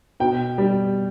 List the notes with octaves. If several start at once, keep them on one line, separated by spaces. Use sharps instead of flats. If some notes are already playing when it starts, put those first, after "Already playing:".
B2 G5
G3